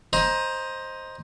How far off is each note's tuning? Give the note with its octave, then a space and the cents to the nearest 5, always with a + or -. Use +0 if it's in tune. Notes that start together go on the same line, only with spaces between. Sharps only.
C5 +10 D#5 +0 A#5 +20